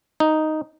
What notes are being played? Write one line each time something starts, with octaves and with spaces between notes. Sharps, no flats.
D#4